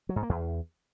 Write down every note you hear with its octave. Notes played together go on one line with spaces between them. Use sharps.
F#3
G#2
A#3
E2